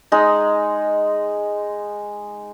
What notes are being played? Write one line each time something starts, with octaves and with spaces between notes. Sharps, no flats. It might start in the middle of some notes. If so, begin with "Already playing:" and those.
G#3 D#4